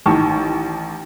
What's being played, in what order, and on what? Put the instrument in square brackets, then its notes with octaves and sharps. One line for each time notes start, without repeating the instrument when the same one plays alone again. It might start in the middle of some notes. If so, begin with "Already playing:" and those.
[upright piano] A1 D#3 A5 C#6